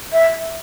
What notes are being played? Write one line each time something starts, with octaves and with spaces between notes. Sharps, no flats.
E5